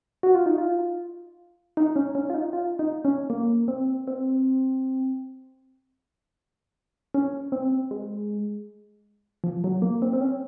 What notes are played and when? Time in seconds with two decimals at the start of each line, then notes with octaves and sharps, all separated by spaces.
0.23 F#4
0.35 F4
0.46 D#4
0.58 F4
1.77 D#4
1.96 C#4
2.15 C#4
2.30 F4
2.34 D#4
2.53 F4
2.79 D#4
3.05 C#4
3.30 A#3
3.68 C4
4.08 C4
7.14 C#4
7.52 C4
7.91 G#3
9.44 F3
9.64 F#3
9.82 A#3
10.02 C4
10.13 C4
10.21 C#4